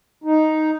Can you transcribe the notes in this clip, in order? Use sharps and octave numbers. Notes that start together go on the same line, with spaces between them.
D#4